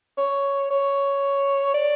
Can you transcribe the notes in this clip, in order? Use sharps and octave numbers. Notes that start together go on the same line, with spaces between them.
C#5
C#5
D5